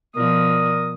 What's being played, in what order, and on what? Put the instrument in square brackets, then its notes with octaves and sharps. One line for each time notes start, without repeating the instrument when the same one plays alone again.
[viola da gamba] B2 F3 [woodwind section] A#4 D5 D#6